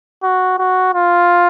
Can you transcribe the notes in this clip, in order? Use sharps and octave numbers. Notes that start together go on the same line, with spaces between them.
F#4
F#4
F4